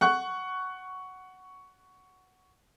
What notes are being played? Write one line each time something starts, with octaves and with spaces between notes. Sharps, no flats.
F#5 C#6 F#6